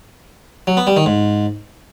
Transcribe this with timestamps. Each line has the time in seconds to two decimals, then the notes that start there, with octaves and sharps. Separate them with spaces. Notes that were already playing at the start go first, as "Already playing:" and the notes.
0.67 F#3
0.77 B3
0.87 G3
0.97 D#3
1.06 G#2